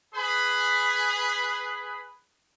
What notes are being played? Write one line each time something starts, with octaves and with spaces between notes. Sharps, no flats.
G#4 B4 B5